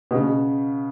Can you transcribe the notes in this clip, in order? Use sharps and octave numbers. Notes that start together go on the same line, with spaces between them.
B2
C#3